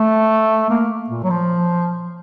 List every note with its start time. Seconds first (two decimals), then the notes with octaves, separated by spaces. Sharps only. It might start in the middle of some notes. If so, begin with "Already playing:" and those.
Already playing: A3
0.70 A#3
1.10 A#2
1.24 F#3
1.30 F3